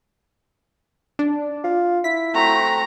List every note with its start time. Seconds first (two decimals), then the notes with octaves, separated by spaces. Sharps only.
1.19 D4
1.64 F4
2.04 E4 B6
2.35 A3 C4 F#4 A#5